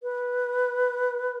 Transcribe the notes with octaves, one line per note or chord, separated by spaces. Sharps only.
B4